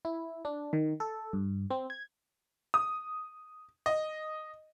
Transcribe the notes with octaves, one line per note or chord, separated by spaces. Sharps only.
E4
D4
D#3
A4
G2
C4
G#6
D#6
D#5